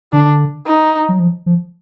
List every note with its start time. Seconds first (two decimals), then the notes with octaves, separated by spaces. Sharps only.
0.13 D3 D4
0.66 D#4
1.09 F#3
1.19 F3
1.46 F3